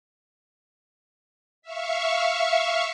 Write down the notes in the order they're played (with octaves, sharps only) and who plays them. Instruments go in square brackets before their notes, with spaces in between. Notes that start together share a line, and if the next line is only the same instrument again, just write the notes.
[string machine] E5 F5 C#6